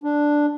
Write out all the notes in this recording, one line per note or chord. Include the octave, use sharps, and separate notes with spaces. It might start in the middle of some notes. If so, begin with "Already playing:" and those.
D4